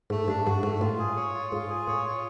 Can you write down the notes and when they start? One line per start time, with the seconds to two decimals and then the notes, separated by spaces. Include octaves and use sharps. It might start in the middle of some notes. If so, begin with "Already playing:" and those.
0.10 G#2 A3
0.28 G2 D4
0.46 G2 F#4
0.63 G#2 A3
0.81 A2 F4
0.99 G#4
1.17 C#5
1.34 F4
1.52 G#2 F4
1.70 G#4
1.87 A2 C#5
2.05 F4